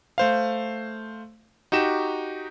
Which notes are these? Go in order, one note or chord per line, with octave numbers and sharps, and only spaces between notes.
A3 C5 F5
D#4 F#4 G4 E7